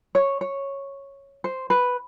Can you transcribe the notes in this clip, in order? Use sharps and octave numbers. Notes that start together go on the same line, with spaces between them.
C#5
C#5
C5
B4